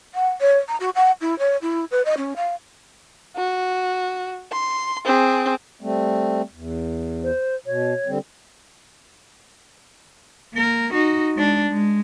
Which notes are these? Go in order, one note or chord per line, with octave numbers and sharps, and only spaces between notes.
F#5
C#5
A#5
F#4
F#5
E4
C#5
E4
B4
D#5
C#4
F5
F#4
C6
C4 G#4
G3 A3 C4
E2
C5
B2 C#5
D3 G3 C4
A#3 A#4
D#4 F#4
G#3 D4
G#3